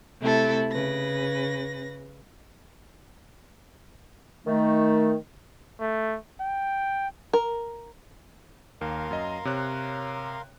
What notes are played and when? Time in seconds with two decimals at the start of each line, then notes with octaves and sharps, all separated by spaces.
0.20 C3 A3 E4 A4
0.70 C#3 B4 A#6
4.47 D#3 A3 D#4
5.80 A3
6.40 G5
7.33 A#4
8.81 D#2 A#3 A#4 F5 C6
9.11 F#2 D#5
9.45 C3 C#5 F#6